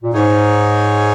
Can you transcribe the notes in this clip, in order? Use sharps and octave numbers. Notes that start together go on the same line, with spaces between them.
A#2
G#2 D#4 G#4 C#5